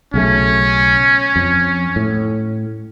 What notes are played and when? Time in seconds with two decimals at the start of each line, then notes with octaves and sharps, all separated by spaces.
0.14 B1 C#3 A3 C#4
1.36 F2
1.96 A2